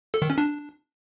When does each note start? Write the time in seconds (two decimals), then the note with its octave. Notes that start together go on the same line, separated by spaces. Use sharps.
0.14 A4
0.22 D#3
0.30 C#4
0.38 D4